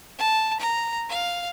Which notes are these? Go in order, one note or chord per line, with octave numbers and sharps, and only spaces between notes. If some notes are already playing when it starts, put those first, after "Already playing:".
A5
A#5
F5